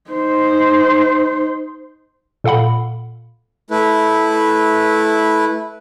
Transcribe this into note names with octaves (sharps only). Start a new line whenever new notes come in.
D#4 C5
A#2 A4 F5 F#5 B5
A3 E4 B4